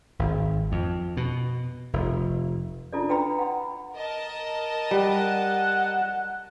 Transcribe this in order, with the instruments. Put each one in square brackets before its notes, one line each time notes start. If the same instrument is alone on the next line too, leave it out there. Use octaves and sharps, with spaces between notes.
[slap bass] G#1
F2
B2
F1
[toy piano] D4 E4 F4 A4 D5
B4 G5 A#5 B5
F#5 B5
[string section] A#4 D#5 A5
[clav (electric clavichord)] G3 [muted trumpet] F#5